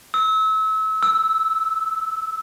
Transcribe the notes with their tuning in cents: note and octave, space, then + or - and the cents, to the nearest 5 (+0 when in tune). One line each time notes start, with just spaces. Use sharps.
E6 -30
E6 -5